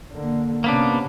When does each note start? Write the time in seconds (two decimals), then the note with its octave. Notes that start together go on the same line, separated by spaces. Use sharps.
0.11 D3 A#3
0.64 C3 A#3 B3 C#4 D4